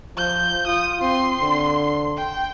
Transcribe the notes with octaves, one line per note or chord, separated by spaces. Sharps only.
F3 G6
F4 D#6
C4 C6
D3
G5